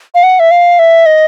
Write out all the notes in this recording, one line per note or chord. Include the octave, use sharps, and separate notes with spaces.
F5
F#5
E5
F5
E5
D#5